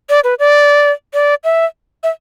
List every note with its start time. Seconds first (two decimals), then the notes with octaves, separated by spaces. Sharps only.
0.09 D5
0.24 B4
0.39 D5
1.14 D5
1.44 E5
2.03 E5